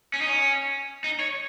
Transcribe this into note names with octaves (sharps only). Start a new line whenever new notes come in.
C#4
D#4
C#4
D#4
C#5